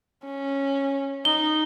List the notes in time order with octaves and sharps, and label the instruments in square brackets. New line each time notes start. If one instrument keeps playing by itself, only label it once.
[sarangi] C#4
[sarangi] D#4 [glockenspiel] G7